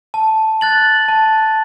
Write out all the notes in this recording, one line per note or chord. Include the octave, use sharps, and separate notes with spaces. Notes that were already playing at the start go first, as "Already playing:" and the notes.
A5
F#6 A6 F#7
A5